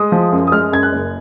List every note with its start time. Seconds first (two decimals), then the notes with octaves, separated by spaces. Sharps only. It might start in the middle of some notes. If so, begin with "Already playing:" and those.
Already playing: G#3 D#6
0.12 F3
0.32 F#2
0.47 D#6
0.52 G#3 F6
0.72 F#2 G#6
0.83 F#6
0.92 F#1